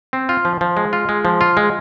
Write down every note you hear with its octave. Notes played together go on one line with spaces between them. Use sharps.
C4
F4
F3
F3
G#3
F4
G#3
F3
F4
G#3